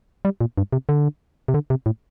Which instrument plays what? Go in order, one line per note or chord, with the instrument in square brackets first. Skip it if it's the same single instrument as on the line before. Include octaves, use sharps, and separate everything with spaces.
[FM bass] G3
A#2
G2
C3
D3
C3
D3
C3
A2